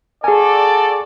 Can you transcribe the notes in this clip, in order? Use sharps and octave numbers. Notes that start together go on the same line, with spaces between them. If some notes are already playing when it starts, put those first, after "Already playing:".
F#4 G#4 A4 D5 G#5